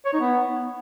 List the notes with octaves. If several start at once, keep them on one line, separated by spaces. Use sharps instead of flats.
C#5
D#4
B3